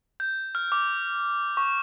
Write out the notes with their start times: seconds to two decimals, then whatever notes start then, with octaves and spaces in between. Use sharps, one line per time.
0.20 G6
0.55 F6
0.72 D6
1.57 C#6